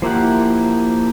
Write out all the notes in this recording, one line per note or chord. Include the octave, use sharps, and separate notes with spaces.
F3 A#3 E4 G4 F#5